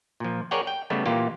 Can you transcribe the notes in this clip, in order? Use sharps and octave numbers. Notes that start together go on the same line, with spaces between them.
A#2 F3
G#4 A#4 C#5 D5 F#5 G5
G5
C#3 G3 A3 B3
A#2 E3 A#3 F4 G4